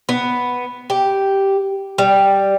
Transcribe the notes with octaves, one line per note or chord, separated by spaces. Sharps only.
B3
G4
G3